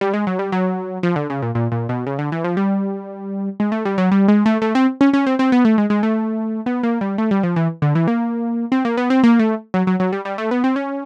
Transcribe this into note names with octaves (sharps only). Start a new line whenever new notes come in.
G3
G#3
F#3
G3
F#3
F3
D3
C#3
A#2
A#2
A#2
B2
C#3
D3
E3
F3
G3
G#3
A3
G3
F#3
G3
G#3
A3
A3
C4
C#4
C#4
C4
C4
B3
A3
G#3
G#3
A3
B3
A#3
G3
A3
G3
F3
E3
D3
E3
A#3
C4
A#3
B3
C4
A#3
A3
F#3
F#3
F#3
G3
G3
A3
B3
C4
C#4